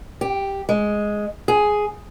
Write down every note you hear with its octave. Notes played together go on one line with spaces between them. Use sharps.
G4
G#3
G#4